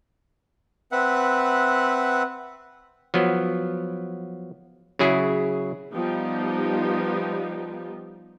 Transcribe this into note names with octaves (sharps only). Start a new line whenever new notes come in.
C4 B4 E5 F#5
F3 F#3 B3
C#3 F#3 E4 G#4
F3 G3 B3 D#4 G4